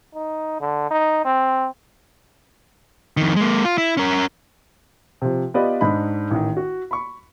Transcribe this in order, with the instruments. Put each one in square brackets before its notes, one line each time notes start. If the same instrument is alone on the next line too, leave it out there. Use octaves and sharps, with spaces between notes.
[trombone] D#4
D3
D#4
C4
[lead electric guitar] F2 D#3
G#3 A#3
F4
E4
C#4 A#4
[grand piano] C3 F3
B3 F4 G4 B4 D5 D#5
G#2 D4 D#4 B5
A1 D#3
F#4
B5 C#6